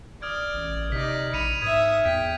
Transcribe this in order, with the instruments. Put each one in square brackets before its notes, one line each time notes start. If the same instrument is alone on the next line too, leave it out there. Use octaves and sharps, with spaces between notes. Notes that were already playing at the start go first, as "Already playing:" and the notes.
[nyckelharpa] D5 [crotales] D#6 F6 G#6
[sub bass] A1
[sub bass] C3 [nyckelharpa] D#4 D5 [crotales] B6
[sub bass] A#1 [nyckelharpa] B5 [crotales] C#7 D#7 F7
[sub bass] G#2 [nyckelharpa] E5 D#6 [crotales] G#6 D#7
[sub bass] E2 [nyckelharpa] G5 [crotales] B6